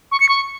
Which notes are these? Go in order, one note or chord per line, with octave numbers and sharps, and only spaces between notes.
C#6
C#7
C#6